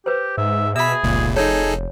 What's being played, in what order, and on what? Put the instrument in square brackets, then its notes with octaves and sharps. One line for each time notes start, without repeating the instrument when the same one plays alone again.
[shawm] G4 [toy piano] B4 C5
[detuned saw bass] G#2 [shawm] E5
[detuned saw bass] B2 [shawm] G#4 [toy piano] E5 B5 [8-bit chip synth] E6 B6
[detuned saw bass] F1 [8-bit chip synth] C#2 A#2
[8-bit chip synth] D#4 G#4 A4 [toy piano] C#5 [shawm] G#5